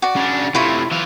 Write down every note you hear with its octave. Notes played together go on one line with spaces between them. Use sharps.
F#4 D5
C#3 D4
C3 A3 E4 F4 C#5
E3 F4